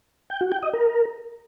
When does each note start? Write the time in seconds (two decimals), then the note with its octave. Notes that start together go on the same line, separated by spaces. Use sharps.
0.30 G5
0.41 F#4
0.52 G5
0.63 D#5
0.73 A#4